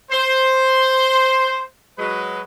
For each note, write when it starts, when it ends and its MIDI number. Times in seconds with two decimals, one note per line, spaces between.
0.12 1.62 72
1.99 2.40 54
1.99 2.40 56
1.99 2.40 71